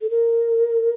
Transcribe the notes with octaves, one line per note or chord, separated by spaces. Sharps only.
A4
A#4